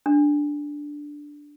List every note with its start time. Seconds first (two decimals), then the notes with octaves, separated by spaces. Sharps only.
0.06 D4